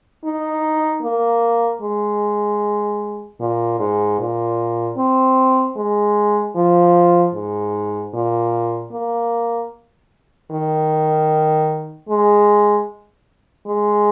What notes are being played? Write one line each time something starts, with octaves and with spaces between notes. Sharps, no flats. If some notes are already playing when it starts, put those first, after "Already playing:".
D#4
A#3
G#3
A#2
G#2
A#2
C4
G#3
F3
G#2
A#2
A#3
D#3
G#3
G#3